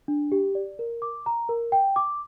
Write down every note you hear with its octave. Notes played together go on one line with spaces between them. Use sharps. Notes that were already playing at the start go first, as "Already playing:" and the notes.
D4
G4
D5
A#4
D6
A#5
A#4
G5
D6